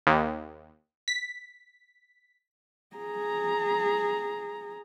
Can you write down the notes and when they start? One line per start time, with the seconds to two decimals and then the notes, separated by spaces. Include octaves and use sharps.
0.07 D#2
1.08 B6
2.96 G#4 A#5